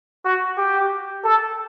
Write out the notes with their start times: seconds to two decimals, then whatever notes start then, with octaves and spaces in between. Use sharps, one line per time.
0.24 F#4
0.57 G4
1.24 A4